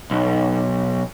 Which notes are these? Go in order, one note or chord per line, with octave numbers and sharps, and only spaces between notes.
B1